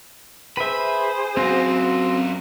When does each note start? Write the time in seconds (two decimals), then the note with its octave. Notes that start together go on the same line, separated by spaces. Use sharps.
0.57 G#4 B4 C5 E5 B5
1.37 F#2 C4 F4 F#4